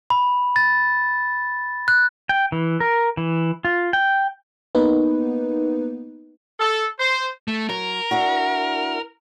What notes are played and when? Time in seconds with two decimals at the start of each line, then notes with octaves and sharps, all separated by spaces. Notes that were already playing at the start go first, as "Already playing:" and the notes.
0.10 B5
0.56 A6
1.88 F#6
2.29 G5
2.52 E3
2.80 A#4
3.17 E3
3.65 F4
3.93 G5
4.75 A#3 B3 D#4 B4
6.60 A4
6.99 C5
7.48 A3
7.69 F#3 A#4
8.11 D4 E4 F#4